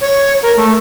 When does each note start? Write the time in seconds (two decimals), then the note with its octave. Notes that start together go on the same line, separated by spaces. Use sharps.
0.01 C#5
0.42 A#4
0.57 A3